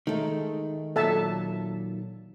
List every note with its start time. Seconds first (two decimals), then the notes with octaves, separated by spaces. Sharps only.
0.07 D#3 G#3 A3 D#4
0.96 A#2 F#3 A4 E5 A5